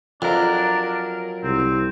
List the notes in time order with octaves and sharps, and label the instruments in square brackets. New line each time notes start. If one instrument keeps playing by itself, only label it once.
[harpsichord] F2 [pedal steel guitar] F#3 A#4 [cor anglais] D4
[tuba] C2 [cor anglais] C4